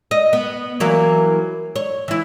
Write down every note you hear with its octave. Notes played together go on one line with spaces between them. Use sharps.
D#5
B3
E3 F#3 A#3
C#5
E3 E4